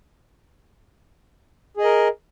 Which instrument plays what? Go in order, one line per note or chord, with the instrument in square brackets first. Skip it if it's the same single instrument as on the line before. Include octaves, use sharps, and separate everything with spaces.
[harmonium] G#4
D#5
A#4